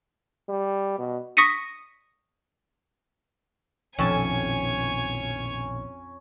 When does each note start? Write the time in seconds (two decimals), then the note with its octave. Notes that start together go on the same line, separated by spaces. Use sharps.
0.49 G3
0.98 B2
1.37 C#6 D#6 A#6 B6 C#7 D#7
3.99 A#1 F2 B2 D#3 C#4 C#5 G#5 A5